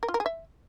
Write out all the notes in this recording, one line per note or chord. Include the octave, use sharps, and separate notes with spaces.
A#4
F4
A#4
G#4
E5